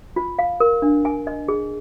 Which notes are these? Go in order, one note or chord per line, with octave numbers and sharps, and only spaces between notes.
F4
F5
A#4
D4
G#5
D#5
G#4